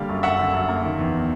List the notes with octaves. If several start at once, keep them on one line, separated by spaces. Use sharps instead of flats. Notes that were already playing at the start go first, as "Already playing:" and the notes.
Already playing: D3 G3 A#3 F5
F#2
F#2 E5 F#5
D3
F#2
A#3
D#3
E2